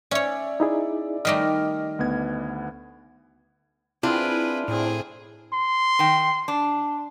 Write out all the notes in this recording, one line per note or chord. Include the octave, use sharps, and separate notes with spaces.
C#4 C#5 D5 E5
D#4 E4 G#4
D#3 G3 A3 D#5 D6 F6 A#6
D2 B3 G#6
C4 D4 E4 F4 G#4 B4
A2 C4 G#4
C6
D#3 G5
D4